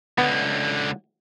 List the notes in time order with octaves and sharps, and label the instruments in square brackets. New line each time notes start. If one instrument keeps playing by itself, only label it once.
[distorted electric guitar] C#2 D3 [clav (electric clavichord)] B3